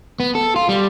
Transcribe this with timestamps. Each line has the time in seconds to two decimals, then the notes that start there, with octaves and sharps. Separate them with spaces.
0.20 B3
0.35 A4
0.56 F4
0.69 G3